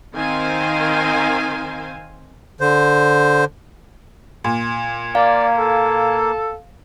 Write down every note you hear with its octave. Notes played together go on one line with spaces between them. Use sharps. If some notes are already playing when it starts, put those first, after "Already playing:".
D#3 C4 C5 F5 G#5
D3 C5
A#2
A#3 D5 F5
A4